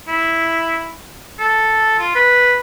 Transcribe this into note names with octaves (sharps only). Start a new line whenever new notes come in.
E4
A4
F4
B4